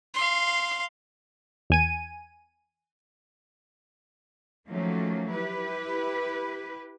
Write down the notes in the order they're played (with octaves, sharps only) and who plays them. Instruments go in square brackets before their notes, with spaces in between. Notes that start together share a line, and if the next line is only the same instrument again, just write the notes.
[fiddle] F5 C6
[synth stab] E2 G#5 D#7
[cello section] D#3 F3 F#3 A3 A#3 C#4
E4 G4 B4